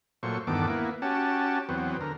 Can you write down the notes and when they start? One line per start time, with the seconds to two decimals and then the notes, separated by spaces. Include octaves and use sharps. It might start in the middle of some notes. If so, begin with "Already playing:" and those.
0.23 A#2 F#3 A3 C5 C#6
0.47 E2 G2 D#3 B3 A4 D6
0.68 A#3 B3 E4
1.02 C#4 F#4 G4 A5
1.69 E2 F#3 B3 C4
2.01 D3 A#4